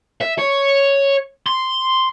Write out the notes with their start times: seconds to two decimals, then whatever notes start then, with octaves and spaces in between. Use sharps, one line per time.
0.21 E5
0.39 C#5
1.46 C6